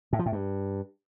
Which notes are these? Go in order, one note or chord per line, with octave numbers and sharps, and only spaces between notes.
A2
F3
A2
G2